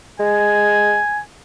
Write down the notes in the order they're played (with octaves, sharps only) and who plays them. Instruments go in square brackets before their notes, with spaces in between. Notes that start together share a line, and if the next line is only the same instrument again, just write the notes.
[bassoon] G#3 [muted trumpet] G#5